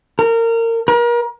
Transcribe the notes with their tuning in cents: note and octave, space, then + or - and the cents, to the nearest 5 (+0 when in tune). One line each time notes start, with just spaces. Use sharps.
A#4 -25
A#4 +35